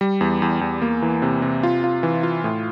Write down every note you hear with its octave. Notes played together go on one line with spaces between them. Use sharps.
G3
E2
E2
E2
A#3
E3
C3
C3
F4
F4
E3
F4
A2